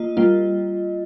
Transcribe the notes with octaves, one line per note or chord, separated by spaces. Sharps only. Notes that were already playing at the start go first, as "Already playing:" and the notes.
Already playing: A#3 F4 D#5
G3 A#3 F4